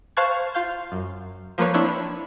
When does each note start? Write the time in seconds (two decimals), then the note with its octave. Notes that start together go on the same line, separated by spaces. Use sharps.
0.17 C5 F5 A5 C#6 F#6 G#6
0.55 F4 F5 G6
0.92 F#2
1.58 F3 A#3 B4 C#5
1.74 C4 D4 E4 C#5 B5